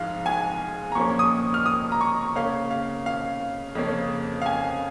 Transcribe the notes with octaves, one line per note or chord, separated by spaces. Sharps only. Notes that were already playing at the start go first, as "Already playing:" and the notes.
Already playing: G#2 F3 G#3 F5
G#5
A#5
A#2 F3 A#3 C#4 C#6
D#6
F6
D#6
A#5
C#6
C#3 A#3 C#4 F5
F5
F5
F2 C#3 A#3 C#4
F5
G#5